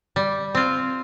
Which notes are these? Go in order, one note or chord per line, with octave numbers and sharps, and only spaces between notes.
G3
C4 F4